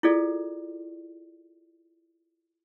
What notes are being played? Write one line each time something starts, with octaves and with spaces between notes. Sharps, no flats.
E4 F4 G#4 A4 D5